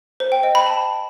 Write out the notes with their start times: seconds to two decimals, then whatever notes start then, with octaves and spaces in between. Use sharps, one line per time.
0.20 C5
0.32 G5
0.43 D#5
0.55 B5
0.66 A5